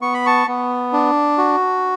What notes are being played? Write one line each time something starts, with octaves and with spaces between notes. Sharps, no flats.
B3 C#6
B5
A5 C#6
B3
D4
F#4